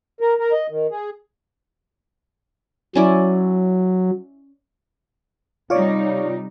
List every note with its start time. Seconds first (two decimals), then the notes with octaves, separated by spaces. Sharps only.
0.21 A#4
0.39 A#4
0.52 D#5
0.70 D#3
0.91 G#4
2.95 F#3 C#4 E4 D5
5.70 C3 G3 D#4 F4 C#5 D5